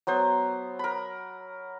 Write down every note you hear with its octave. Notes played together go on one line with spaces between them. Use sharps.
F#3 B3 C5
A#4 B5